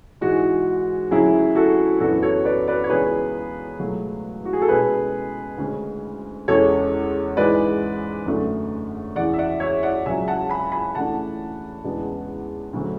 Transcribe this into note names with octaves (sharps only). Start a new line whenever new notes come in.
G#2 E3 G#3 F#4
D2 C#3 F#3 C#4 E4 G#4
F#4 A4
F#2 C#3 E3 B3 D4 F#4 A4
A4 C#5
B4 D5
B4 D5
C#5
C#2 C#3 E3 B3 D4 G#4 B4
C#2 B2 F#3 A3
F#4
G#4
A4
B2 G#3 C#4 G#4 B4
D2 C#3 G#3 C#4
E2 C#3 G#3 C#4 A4 C#5
G#2 E3 G#3 C#4 B4 D5
F#2 D3 A3 D4
E2 C#3 E3 D5 F#5
E5
D5 F#5
C#5 E5
D5 F#5
C#2 C#3 F#3 E5 G#5
F#5 A5
G#5 B5
G#5 B5
C#3 E3 A3 D4 F#5 A5
E2 C#3 G#3 B3 D4
D2 C#3 F#3 A3 C#4